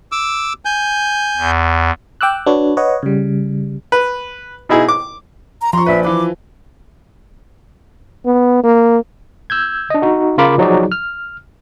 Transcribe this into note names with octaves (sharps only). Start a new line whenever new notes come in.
D6 E6
G#5 G6
E2
G5 D6 E6 F#6
D4 F#4 B4 C#5
B4 C#5 D#5 F#5
C#3 G3
B4
B2 D#4 E4 G#4
D6
A#5
F3 A#5 C6 C#6
A#1 B4 E5
E3 B4 D6
B3
A#3
E6 G6 G#6
D4 D#5
D#4 F#4
C#3 F4 A#4 B5 D6
F3 F#3 D#4 F#4 G#4 D5
F6